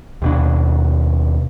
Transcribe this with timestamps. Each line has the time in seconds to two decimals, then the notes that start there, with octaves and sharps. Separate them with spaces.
0.22 D#2 B2 D4